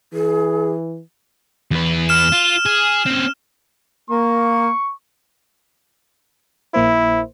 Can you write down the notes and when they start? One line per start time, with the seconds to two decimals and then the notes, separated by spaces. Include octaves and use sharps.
0.13 E3 G#4
1.71 E2 B4
2.09 F6 E7
2.33 F4
2.66 G#4
3.06 C4 C#4
4.10 A#3 C#6
6.74 A#1 A#3 E4 C5